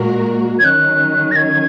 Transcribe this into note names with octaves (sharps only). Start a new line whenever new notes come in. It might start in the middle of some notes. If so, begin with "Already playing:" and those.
Already playing: A#2 G#3 F#4 A#4
G#6
D#3 F#3 C#4 F#6
A#6
G#6